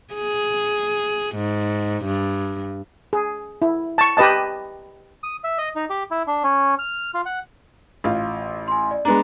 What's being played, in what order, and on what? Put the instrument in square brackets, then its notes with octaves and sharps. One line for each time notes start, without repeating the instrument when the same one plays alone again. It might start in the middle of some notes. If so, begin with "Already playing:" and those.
[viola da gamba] G#4
G#2
G2
[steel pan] G#4
E4
A5 C#6
G4 B4 D#5 A5
[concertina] D#6
E5
D#5
D#4
G4
E4
D4
C#4
F6
F4
F#5
[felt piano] A1 F4
[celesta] G#5 C6
D5
[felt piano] G#3 B3 D4 [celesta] A#5